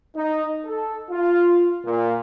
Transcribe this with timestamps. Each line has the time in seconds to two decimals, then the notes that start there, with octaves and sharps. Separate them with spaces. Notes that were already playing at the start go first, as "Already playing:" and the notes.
0.16 D#4
0.65 A4
1.11 F4
1.85 A#2